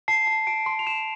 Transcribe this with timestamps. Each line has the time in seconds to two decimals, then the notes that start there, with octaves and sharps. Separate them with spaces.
0.08 A5 C7
0.27 A5
0.47 A5 D7
0.66 C6
0.79 F7
0.87 C6 E7